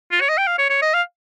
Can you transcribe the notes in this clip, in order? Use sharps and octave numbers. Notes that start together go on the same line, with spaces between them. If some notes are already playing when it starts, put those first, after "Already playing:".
F4
C#5
D#5
G5
F5
C#5
C#5
D#5
F5